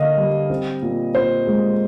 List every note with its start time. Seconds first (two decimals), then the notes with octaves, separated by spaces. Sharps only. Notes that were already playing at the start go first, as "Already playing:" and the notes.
Already playing: D3 A#3 D4 D#5 F5
0.17 G3
0.50 C4
0.82 A#2
1.15 A#2 C5
1.47 G#3